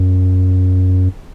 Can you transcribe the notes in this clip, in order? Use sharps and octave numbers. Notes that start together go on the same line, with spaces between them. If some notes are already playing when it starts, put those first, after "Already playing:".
Already playing: F#2